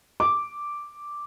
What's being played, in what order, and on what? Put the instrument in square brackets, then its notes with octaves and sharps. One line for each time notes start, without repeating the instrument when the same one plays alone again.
[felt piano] D6